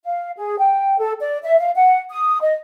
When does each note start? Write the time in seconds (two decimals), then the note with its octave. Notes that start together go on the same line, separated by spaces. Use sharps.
0.05 F5
0.37 G#4
0.59 G5
0.99 A4
1.20 D5
1.44 E5
1.59 F5
1.75 F#5
2.10 D#6
2.43 D#5